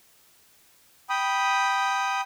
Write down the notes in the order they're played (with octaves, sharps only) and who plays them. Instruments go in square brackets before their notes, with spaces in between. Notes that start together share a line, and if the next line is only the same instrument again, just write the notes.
[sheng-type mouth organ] G5 B5 D#6